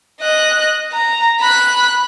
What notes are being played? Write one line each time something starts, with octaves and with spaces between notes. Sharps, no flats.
D#5 F#6
A#5
B5 F#6